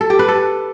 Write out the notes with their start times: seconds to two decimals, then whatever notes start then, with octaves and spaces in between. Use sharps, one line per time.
0.01 A4
0.10 G4
0.19 B4
0.28 A4